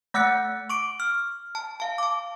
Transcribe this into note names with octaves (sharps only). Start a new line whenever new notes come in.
A3 F#5 E6 F#6 A6 C#7
C#6 D6 D7
F6
A5
F5 A5
A5 D6